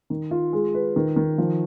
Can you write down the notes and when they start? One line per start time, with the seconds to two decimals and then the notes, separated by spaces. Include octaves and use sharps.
0.10 D#3
0.31 F4
0.53 G#3
0.74 B4
0.96 D#3
1.16 D#3
1.38 F3